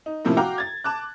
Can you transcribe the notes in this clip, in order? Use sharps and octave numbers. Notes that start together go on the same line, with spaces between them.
D#4
A2 C3 F3 A#3 C#4 E4
F#4 F5 G5 A#5 D6
G#6 A6
A5 D6 F#6